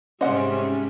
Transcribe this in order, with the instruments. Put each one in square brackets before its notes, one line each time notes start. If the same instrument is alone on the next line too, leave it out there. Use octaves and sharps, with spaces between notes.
[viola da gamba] G#2 C3 G3 [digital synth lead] C#4 [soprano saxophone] C5 [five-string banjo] D#5 F#5